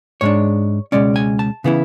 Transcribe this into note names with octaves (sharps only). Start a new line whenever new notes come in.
G#2 G#3 D4 C#5
C#2 B2 G#3 C#4 D5
G#5
A5
C#3 E3 B3 E4